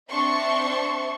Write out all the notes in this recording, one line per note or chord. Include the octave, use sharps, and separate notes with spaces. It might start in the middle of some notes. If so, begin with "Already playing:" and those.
C4 D4 E5 C6 C#6